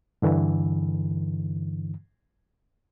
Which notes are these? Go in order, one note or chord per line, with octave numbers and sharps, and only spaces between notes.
G2 D3 E3